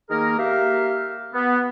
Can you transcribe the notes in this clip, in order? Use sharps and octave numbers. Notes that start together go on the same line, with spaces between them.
D#3 A#3 G#4 A#4
A#3 G4 E5 F5
B3